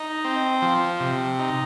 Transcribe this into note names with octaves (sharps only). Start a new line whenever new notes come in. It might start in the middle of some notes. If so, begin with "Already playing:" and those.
Already playing: D#4
C4
F3
C3
D#4